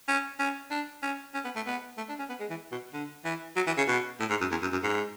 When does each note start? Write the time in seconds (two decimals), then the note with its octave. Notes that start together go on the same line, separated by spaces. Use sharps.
0.08 C#4
0.39 C#4
0.71 D4
1.02 C#4
1.34 C#4
1.45 B3
1.55 A3
1.66 B3
1.97 A3
2.09 D4
2.19 C#4
2.29 B3
2.40 G#3
2.50 E3
2.72 B2
2.93 D3
3.25 E3
3.56 F#3
3.67 E3
3.77 C#3
3.88 B2
4.20 A2
4.30 G#2
4.41 F#2
4.51 E2
4.62 F#2
4.72 F#2
4.83 G#2